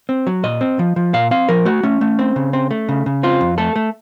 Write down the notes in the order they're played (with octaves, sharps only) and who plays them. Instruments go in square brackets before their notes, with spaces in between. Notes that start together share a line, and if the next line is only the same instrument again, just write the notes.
[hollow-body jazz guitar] C4
F#3
A#2 D#5
C4
F3
F3
A#2 F5
C4 F5
F3 A#4
A3 F#4
A3 C#4
A3
C4
C#3
C4
A3
C#3
C#3
C4 F4
F2
A3 A4
A3